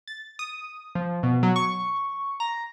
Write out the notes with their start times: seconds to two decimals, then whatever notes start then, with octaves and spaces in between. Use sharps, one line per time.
0.07 A6
0.39 D#6
0.95 F3
1.23 B2
1.43 F#3
1.56 C#6
2.40 A#5